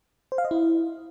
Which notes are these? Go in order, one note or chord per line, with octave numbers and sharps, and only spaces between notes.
C5
F5
D#5
E4